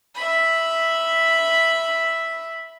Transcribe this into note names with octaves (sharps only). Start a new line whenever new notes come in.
E5 B5